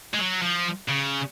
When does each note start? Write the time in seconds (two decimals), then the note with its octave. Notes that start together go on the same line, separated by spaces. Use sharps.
0.14 G#3
0.19 F#3
0.42 F3
0.89 C#3